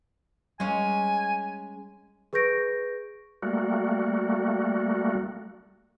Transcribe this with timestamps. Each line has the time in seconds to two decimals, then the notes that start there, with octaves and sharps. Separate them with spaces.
0.60 G3 G#3 C#4 G#5
2.33 G#4 B4 C#6 G6 A#6 D7
3.42 G3 A3 A#3 F#4